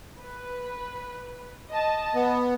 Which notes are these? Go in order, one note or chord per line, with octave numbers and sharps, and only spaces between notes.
B4
D#5 A5
B3